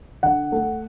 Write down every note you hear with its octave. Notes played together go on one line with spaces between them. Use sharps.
D3 F#5
A3